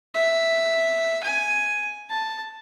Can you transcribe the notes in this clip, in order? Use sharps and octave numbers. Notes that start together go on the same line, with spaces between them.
E5
G#5
A5